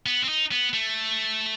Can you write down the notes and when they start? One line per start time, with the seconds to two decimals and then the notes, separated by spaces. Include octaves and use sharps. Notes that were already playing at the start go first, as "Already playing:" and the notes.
0.06 B3
0.24 C4
0.29 D#4
0.52 B3
0.73 A3